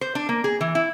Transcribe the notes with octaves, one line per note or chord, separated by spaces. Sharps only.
C5
D4
A#3
G#4
E3
E4